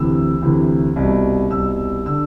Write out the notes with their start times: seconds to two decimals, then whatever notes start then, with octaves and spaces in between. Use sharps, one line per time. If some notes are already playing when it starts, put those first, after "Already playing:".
Already playing: D2 C3 E3 E6
0.42 D2 C3 E3
0.96 C2 B2
1.51 C2 B2 E6
2.06 D3 E6